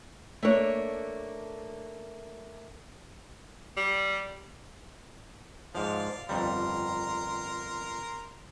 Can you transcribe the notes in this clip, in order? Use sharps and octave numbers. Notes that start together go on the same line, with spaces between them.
A3 A#3 D4 C#5
G3
G#2 F3 D5 F5
G1 F2 G3 A#4 A#5 C6